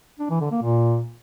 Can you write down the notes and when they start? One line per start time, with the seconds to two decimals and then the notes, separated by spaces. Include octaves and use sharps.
0.20 D4
0.30 E3
0.41 D3
0.52 A#3
0.62 A#2